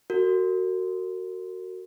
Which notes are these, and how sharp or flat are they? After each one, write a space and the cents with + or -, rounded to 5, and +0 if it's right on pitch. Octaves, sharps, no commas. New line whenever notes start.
F#4 +5 A#4 -35